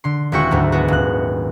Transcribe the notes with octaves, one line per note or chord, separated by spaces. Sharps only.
D3 C6
D#1 G#3 E4 F#4 G5 C#6
D2 G#2 F#3
G#3 B3 F#4
D#1 F#6